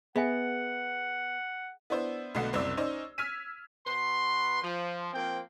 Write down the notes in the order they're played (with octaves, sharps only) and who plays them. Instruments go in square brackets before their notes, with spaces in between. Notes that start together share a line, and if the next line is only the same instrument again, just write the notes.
[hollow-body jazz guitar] B3 [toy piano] G#4 E5 G#5 [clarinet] F#5
[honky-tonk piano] B3 D4 E4 C5
B1 B2 D3 A3 F#5 C7
F#1 C2 D5 E6
C#4 D#4 C5 D5
E6 F6 G#6 B6 D#7
[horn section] B2 B4 C6
F3
F3 A#3 C4 G5